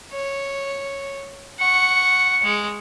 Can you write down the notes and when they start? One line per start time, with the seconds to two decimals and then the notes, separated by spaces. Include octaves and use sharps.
0.12 C#5
1.59 F#5 C#6 C#7
2.43 G#3